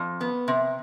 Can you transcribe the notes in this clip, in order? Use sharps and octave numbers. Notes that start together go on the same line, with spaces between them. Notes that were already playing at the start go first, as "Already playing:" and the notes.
Already playing: F2
B3
C3